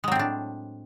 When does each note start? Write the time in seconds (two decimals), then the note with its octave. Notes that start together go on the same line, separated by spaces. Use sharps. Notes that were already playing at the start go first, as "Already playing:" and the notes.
0.04 G#3
0.08 F#3
0.12 C4
0.15 A2
0.19 D4